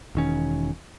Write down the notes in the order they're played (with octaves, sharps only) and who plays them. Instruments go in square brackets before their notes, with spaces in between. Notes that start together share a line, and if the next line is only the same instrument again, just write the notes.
[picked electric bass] E1 D#3 C#4